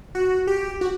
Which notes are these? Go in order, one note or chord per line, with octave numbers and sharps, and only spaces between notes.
F#4
G4
F#4